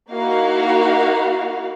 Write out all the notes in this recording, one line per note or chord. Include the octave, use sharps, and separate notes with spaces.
A#3 D#4 E4 F#4 F5